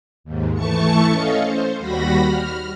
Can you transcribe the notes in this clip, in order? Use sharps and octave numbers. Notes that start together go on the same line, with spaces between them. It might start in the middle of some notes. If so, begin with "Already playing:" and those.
D#2 G#2
E3 A3 A5 C#6 C#7
C#4 A4 D#5 F5
C5
D#2 G3 F#4 B5 A#6
F6